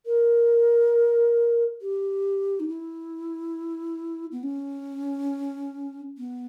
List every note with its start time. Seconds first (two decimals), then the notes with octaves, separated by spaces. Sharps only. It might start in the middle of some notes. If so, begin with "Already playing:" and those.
0.06 A#4
1.81 G4
2.60 D#4
2.68 E4
4.32 B3
4.43 C#4
6.18 B3